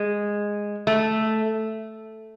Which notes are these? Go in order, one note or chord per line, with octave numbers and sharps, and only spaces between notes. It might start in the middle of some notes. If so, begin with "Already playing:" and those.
Already playing: G#3
A3